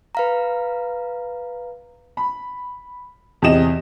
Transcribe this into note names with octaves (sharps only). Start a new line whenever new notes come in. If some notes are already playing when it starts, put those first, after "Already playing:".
B4 F5 A#5
B5
E2 C3 G4 D#5 E7